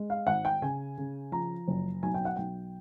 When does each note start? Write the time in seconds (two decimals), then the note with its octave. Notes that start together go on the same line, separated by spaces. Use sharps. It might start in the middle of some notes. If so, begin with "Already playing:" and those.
Already playing: G#3
0.10 F5
0.27 G#1 F#5
0.45 G5
0.62 C#3 G#5
0.98 C#3
1.32 F3 A#5
1.68 F#1
2.03 B1 G#5
2.14 G5
2.25 F#5
2.36 B1 G5